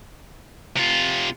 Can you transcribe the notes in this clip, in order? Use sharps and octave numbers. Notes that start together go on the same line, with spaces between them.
C3 F4